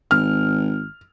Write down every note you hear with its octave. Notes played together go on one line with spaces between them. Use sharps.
G#1 F6